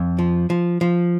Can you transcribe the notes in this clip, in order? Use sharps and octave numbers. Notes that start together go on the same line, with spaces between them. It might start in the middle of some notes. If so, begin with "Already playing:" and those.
Already playing: F2
F3
F3
F3